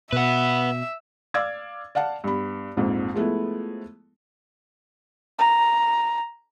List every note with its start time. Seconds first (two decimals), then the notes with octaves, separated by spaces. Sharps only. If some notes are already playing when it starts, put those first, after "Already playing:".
0.12 B2 B4 E5 F#5
1.34 D5 F5 D6 E6 G#6 A6
1.95 D5 F5 F#5 A5
2.24 G2 B3 B5
2.77 A#1 F2 G#2
3.14 F3 G#3 A3 B3 E4
5.39 A#5